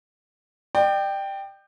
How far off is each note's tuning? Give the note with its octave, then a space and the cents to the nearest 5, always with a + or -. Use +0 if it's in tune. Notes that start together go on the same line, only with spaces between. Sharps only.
D5 +40 G5 +0